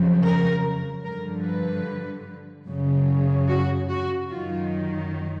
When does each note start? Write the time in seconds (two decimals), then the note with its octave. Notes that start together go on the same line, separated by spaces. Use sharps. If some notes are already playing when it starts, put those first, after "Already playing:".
Already playing: F2 C#3 F#3
0.22 A#4
1.04 G2 D3 F3 A#4
1.45 B4
2.67 F#2 C#3 F#3
3.49 F#4
3.90 F#4
4.30 F#2 D#3 F#3 F4